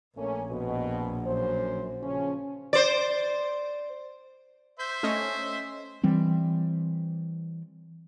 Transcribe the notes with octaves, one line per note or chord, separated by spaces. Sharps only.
A#1 A3 A#3 C#4
F2 B2
F#2 C5
C#3 F3 C#4
C5 D5
C5 E5 G6
A3 C#4 D#5
E3 G3 C4